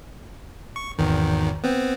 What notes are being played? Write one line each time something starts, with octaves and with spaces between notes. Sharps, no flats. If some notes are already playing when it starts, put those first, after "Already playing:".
C#6
G#1 E2 D#3
B3 C4